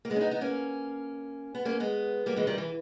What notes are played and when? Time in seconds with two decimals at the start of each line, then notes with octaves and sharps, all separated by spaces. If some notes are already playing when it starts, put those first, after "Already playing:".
0.05 A#3
0.10 G#3 B3
0.16 C#4
0.21 B3 D#4
0.31 B3 D#4
0.41 A#3 C#4
1.55 B3
1.65 A#3 C#4
1.80 G#3 B3
2.26 G3 A#3
2.36 E3 G#3
2.47 D#3 G3
2.58 E3